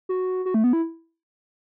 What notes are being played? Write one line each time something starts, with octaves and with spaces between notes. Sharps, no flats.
F#4
F#4
A3
B3
E4